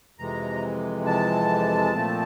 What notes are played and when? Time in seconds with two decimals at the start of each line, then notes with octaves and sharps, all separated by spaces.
0.18 F2 C3 E3 G#3 A#5
1.06 A5
1.93 A#2 F3 A3 C4